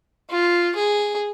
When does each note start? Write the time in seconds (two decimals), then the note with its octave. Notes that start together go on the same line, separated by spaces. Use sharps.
0.30 F4
0.75 G#4